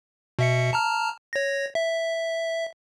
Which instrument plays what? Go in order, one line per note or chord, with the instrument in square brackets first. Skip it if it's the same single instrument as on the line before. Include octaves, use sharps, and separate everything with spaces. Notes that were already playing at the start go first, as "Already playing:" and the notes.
[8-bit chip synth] B2 E5 C#7
A5 A#5 F6
C#5 A#6
E5